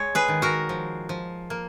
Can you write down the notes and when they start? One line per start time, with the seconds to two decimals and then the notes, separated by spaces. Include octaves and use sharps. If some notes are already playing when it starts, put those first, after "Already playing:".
Already playing: G#3 C#5
0.15 G#4 B4
0.28 D#3
0.42 F#4 A#4
0.69 F3
1.09 F3
1.50 A#3